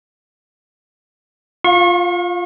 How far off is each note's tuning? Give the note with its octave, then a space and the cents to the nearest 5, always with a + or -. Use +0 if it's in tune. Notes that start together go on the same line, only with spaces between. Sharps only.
F4 +0 F5 +40 C#6 -35